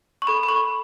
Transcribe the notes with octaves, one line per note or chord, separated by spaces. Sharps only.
C#6
A4 B5
B5
C#6